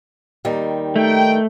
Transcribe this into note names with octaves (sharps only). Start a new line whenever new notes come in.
D#2 D#3 G3
A3 D#4 G5